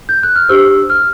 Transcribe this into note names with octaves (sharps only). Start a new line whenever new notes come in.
G6
F#6
F6
D4 G4 C5 E6
F6